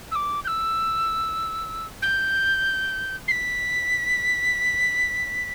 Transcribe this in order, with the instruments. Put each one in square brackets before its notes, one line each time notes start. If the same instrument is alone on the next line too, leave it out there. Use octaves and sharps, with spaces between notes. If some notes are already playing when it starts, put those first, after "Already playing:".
[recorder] E6
D6
G6
E6
G6
C7
B6